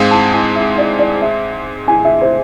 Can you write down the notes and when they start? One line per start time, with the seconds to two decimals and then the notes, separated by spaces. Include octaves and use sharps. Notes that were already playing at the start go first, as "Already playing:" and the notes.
Already playing: G#2 G#3 C4 G#4 F5
0.11 A5
0.33 G#5
0.56 E5
0.78 D5
0.99 D5
1.22 E5
1.88 G#5
2.05 E5
2.22 C5